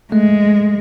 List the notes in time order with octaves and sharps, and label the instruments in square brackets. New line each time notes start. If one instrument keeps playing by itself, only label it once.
[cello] G#3 [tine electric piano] A3